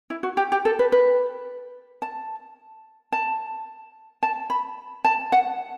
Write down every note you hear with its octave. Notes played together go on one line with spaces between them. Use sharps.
E4
F#4
G4
G4
A4
B4
B4
A5
A5
A5
B5
A5
F#5